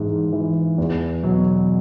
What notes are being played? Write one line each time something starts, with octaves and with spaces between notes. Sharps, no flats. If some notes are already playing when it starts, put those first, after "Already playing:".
Already playing: G#2 E3
E3
E2
B2 F#3